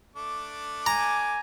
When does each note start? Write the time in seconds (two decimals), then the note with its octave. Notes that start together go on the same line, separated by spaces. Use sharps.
0.16 A3 D4 D6
0.86 G#5 A#5